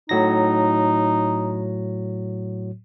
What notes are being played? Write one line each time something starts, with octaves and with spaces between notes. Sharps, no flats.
A2 F#3 D#4 A#6